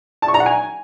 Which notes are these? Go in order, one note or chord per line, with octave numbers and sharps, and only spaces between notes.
A5
C#6
A#5
F#5
G#5